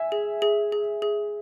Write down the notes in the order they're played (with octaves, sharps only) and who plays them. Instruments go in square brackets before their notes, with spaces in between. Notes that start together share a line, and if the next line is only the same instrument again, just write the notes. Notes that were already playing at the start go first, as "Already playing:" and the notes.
Already playing: [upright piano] E5 G#5
[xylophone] G#4
G#4
G#4
G#4